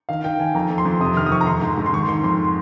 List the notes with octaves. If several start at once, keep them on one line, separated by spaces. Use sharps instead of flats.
D#3 F5
D#3 G5
D#3 G#5
F2 A#5
F2
C6
F2
C3 D#6
D#3 F6
D#6
F2 C#6
A#5
D#3 C6
G#2
G#2
C6
D#3 C#6
D#3 C6
F2 C6